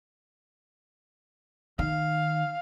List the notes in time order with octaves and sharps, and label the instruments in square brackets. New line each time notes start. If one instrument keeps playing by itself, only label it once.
[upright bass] D#3 [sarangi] F5